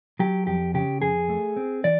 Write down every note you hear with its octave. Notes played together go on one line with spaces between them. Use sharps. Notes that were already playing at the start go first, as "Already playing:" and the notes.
F#3 G4
F2 G4
C#3 G4
F2 G#4
A3
C4
E3 D5